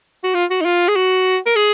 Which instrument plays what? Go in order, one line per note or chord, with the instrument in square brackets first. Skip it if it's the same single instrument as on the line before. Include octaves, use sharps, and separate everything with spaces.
[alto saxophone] F#4
F4
F#4
D#4
F4
G#4
F#4
A#4
G#4